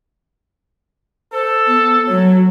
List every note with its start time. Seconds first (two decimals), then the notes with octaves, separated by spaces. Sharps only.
1.33 A4 C5
1.67 B3
2.06 F#3 C#5